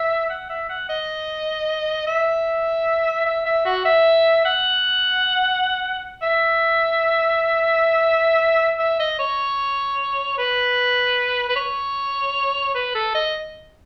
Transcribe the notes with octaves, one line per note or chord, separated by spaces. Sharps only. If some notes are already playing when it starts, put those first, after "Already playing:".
Already playing: E5
F#5
E5
F#5
D#5
E5
E5
E5
F#4
E5
F#5
E5
E5
D#5
C#5
B4
B4
C#5
B4
A4
D#5